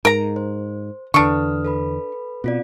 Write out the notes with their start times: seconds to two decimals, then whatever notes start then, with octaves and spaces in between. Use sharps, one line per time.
0.05 G#2 A#4 A#5
0.36 C5
1.14 E2 D3 D4 B4 C#6 D#6 F6
1.65 A4 B4 B5
2.44 B2 C4 F4 D5